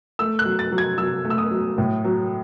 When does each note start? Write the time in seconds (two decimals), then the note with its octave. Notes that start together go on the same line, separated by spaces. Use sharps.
0.19 A3 E6
0.39 F#6
0.45 F#3
0.59 A6
0.72 F#3
0.78 G#6
0.98 F#3 E6
1.25 A3
1.30 E6
1.38 D#6
1.51 F#3
1.78 A2
2.05 F#3